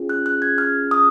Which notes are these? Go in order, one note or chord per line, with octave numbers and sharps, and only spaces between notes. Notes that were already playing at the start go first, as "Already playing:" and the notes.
Already playing: C#4 F4 G#4
F#6
F#6
G#6
F6
D#6